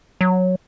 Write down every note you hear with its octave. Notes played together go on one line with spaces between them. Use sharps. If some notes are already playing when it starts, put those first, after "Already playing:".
F#3